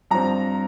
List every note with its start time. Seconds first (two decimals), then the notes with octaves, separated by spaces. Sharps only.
0.11 G2 F3 C4 A#5